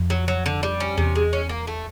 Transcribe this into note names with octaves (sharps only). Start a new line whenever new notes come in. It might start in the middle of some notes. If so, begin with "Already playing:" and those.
Already playing: F2
F#3
F#3
D3
G3
C#4
E2 C3
G#3
C#4
A#3
A3